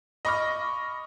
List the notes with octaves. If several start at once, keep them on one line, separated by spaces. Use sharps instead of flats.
D#5 B5 C#6 D6 F6 A#6